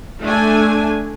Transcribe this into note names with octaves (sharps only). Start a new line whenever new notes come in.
A3 D4 G#5